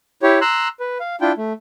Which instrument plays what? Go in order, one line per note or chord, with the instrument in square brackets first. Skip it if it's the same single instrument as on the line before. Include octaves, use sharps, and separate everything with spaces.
[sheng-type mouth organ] E4 G4 C#5
A#5 C6 E6 F#6
B4
F5
D4 E4 F4 G5
A3